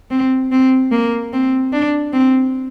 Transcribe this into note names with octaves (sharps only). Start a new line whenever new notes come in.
C4
C4
A#3
C4
D4
C4